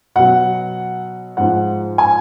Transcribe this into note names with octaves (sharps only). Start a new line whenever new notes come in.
B2 F#3 F#5
G#2 F3 G#3 F#5
G#5